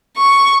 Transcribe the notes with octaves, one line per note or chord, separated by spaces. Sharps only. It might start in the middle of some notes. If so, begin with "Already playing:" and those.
C#6